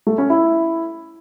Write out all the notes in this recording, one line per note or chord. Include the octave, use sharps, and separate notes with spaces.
A3
C#4
E4